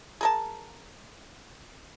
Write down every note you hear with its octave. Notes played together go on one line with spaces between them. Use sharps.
G#4 A#4 A5